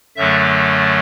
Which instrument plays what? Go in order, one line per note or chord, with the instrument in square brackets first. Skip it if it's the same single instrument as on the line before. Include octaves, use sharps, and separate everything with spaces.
[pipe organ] F#2 D3 F#3 A3 E5